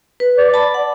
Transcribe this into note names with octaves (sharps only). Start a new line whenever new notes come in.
B4
D5
A5 B5
F#5